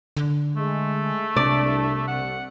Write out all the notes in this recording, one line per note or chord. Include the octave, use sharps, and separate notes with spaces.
D3
G#3 A3
C2 C3 D4 D5
C2 F#5